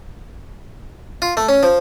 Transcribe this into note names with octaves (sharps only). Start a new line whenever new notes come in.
F4
A3
C#4
F3